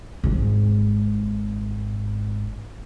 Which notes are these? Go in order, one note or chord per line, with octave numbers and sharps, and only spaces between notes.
G#1 G#2